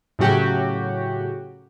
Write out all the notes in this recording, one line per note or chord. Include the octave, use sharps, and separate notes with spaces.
A2 C#3 F#3 F#4 G4